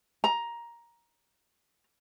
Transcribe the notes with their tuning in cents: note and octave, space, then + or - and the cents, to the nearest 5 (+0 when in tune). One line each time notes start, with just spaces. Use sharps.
A#5 +10